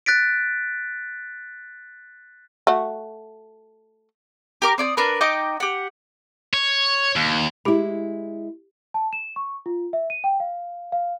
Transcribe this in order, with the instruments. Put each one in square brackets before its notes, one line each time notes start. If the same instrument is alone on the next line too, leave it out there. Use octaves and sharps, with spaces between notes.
[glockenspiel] F#6 A6 B6 D7
[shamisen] A3 F#4
[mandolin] G4 A#4 D6
C4 D5 G#5 D#6
D4 A#4 B4
D#4 D#5 G5 D6
G4 F#5
[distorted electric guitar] C#5
D#2
[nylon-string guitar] G#3 E4 [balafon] G4 B5
[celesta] A5
E7
C#6
F4
E5
D#7
G5
F5
F5